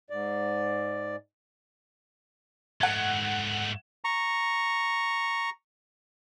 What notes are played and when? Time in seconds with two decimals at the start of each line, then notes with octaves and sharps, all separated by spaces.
0.10 G#2 D5
2.81 G#2 A3 F#5 G#6
4.05 A#5 C#6